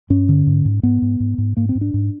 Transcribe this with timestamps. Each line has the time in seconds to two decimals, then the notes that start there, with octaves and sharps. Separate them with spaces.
0.10 G2 C#4
0.29 D3
0.47 G#2
0.65 G#2
0.83 G#2 B3
1.02 G#2
1.20 G#2
1.38 G#2
1.57 G#2 A#3
1.69 C4
1.75 G#2
1.81 D4
1.94 G#2